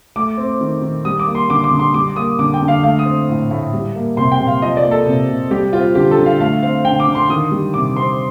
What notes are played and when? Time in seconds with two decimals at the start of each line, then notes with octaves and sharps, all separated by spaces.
0.16 A3 D6
0.38 C4
0.61 D#3
0.82 D#3
1.05 G3 D#6
1.20 D6
1.27 A#3
1.35 C6
1.49 D3 D6
1.64 D6
1.71 D3
1.79 C6
1.94 G3 D6
2.16 A#3 D#6
2.39 D3 D6
2.54 G5
2.61 D3
2.68 F5
2.83 A3 F5
2.99 D#6
3.05 C4
3.29 A2
3.51 A2
3.73 G3
3.95 A#3
4.17 C3 C6
4.32 G5
4.40 C3
4.47 F5
4.62 F3 D#5
4.77 D5
4.84 A#3
4.91 A4
5.06 C3
5.29 C3
5.51 G3 G4
5.73 C4 F4
5.95 D3 G4
6.11 A4
6.18 D3
6.26 F5
6.40 A3 F5
6.63 C4 F5
6.85 D3 G5
7.00 D6
7.08 D3
7.15 C6
7.30 D#3 D#6
7.51 G3
7.74 C3 D6
7.96 C4 C6